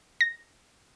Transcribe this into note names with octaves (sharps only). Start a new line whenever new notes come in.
A#6